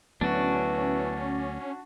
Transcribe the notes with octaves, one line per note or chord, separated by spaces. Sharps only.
D2 E3 F#3 B3 C#4 D4 F#4